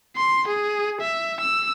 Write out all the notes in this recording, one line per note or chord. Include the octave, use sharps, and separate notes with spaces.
C6
G#4
E5
E6